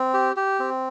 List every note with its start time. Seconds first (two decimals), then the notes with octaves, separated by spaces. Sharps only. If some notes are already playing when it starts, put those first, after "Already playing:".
Already playing: C4
0.14 G4
0.36 G4
0.60 C4